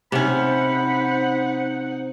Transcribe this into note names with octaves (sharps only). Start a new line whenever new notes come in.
C3 C#4 D#4 C5 F#5 B5